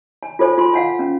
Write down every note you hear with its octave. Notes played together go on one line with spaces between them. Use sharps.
G#5
F4 A4 C5 G#5
F4 G#5 C6
F5 F#5 G#5
C#4